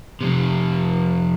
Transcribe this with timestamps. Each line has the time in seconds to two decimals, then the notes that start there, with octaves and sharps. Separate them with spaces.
0.21 F2 C3